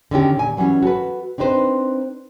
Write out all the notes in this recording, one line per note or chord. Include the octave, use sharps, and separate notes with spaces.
D3 D#3 C#4 G4
A#2 G#5
E3 F#3 G3 C#4
F#4 A4 B4
C4 D4 D#4 B4 C5